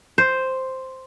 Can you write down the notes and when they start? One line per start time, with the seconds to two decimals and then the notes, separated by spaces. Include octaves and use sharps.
0.18 C5